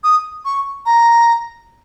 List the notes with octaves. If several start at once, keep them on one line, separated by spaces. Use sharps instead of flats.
D#6
C#6
A#5